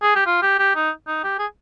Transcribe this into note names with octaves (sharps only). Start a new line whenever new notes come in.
G#4
G4
F4
G4
G4
D#4
D#4
G4
G#4